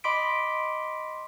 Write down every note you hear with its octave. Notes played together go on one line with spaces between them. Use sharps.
D#5 B5 C6 D6 B6 D7